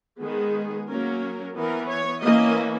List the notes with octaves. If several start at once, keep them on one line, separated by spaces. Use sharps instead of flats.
D#3 G#3 B3 G#4
F#3 A#3 C#4 A#4
E3 B3 A#4
C#5
E3 A#3 C#4 D#5